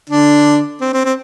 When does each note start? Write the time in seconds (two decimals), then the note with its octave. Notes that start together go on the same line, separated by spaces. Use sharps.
0.10 D3 D4
0.81 C4
0.94 C4
1.05 C4